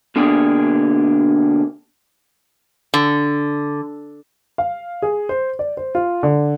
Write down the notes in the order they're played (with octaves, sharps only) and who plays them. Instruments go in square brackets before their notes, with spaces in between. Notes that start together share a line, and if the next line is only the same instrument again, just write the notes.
[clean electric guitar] B2 D3 A#3 D4 G4 G#4
[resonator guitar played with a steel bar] D3
[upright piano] F5
G#4
C5
D5
C5
F4
D3